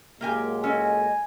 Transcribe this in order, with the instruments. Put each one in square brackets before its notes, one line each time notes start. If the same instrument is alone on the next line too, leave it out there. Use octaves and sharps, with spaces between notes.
[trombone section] A#2 F#3 G#3 [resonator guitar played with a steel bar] A#3 G4 G#5
[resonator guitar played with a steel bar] C#4 A4 [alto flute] D#5 [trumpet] G#5